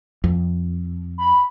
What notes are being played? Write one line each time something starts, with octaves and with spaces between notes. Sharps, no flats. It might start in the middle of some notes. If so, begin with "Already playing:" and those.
F2
B5